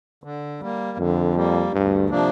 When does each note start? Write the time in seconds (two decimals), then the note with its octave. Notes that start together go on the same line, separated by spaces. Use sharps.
0.24 D3
0.60 G3 A#3
0.98 F2 D3
1.35 G3 A#3
1.73 D2 G2
2.09 C3 F3 A#3 D4